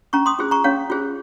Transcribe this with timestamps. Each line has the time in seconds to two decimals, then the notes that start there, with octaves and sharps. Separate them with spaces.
0.13 C#4 A#5 C#6
0.26 C6 D#6
0.39 F4 G#4 C5
0.51 A#5 C#6
0.64 C#4 C#5 F5
0.90 F4 G#4 C5